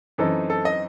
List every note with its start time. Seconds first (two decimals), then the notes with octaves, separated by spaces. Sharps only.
0.18 F#2 E3 C4 D#4 A4
0.50 A4
0.65 D#5